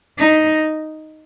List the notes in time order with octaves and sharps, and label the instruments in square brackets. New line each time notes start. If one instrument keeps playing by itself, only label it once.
[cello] D#4